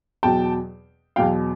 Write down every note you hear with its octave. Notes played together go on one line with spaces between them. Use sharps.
E2 B2 F#3 G5 A5
E2 B2 F#3 F5 G5